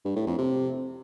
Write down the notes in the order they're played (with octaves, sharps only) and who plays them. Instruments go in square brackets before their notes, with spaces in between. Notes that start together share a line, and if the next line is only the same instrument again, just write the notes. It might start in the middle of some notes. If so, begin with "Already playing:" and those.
[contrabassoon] G2
A2
F2
C3